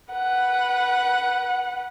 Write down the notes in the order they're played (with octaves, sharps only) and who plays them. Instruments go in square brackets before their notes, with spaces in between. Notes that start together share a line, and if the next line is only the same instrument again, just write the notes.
[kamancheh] B4 F#5